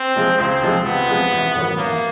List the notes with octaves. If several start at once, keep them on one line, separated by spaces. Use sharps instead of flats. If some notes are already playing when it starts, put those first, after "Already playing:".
Already playing: C4
C3 F3 G#3
C#2 C4
C3 F3 G#3
C#2 B3
C3 F3 G#3
A1
G#2 D#3 F#3
A1 A#3